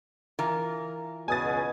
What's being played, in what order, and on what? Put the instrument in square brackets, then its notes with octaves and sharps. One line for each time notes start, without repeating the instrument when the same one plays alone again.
[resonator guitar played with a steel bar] E3 F4 A#4
[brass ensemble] C#2 B2 [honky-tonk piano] G#5 D#6 A6